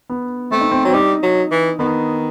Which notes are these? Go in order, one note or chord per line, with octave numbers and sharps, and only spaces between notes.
B3
A3 C4
D#4
C4
F#3 C4
G3 D#4
F#3
E3
D#3 B3